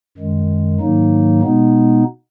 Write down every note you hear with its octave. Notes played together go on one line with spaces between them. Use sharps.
F#2 D#3 G#3
G#2 D#3 F#3 A#3 D#4
B2 G#3 B3 D#4